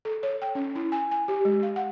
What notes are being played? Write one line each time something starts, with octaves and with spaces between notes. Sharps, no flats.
A4
C#5
G5
C#4
E4
G#5
G#5
G4
G#3
F5
F#5